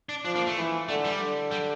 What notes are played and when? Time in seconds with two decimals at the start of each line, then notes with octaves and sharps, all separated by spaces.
0.09 D4
0.25 F3 D4
0.35 A#3
0.47 A3
0.57 E3
0.88 D3 A3
1.05 G3
1.20 D3
1.51 G3